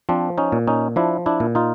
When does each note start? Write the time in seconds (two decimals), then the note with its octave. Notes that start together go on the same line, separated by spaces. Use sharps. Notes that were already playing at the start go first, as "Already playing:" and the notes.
0.09 F3 C4 D4
0.38 C#4 D#4
0.52 A#2
0.68 C#4 D#4
0.96 F3 D4 E4
1.26 D4 E4
1.40 A#2
1.55 D#4 F4